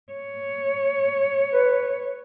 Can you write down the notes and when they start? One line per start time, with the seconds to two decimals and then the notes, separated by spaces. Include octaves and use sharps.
0.12 C#5
1.53 B4